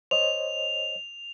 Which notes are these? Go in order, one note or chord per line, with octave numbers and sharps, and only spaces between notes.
C5 C#5 D#5 F7